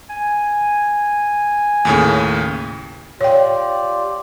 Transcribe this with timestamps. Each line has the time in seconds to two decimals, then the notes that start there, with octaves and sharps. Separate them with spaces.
0.10 G#5
1.85 D#2 A2 C#3
3.21 F4 G4 C#5 D5 G5